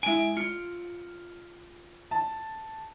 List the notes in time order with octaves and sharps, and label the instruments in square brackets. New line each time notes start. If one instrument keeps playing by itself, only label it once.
[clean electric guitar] G#3 G#5 [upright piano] E4 D7
[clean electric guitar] F4 [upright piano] C#7
[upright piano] A5